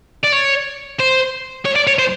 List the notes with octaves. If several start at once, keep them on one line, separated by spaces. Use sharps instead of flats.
D5
C#5
C5
C#5
D5
C#5
C5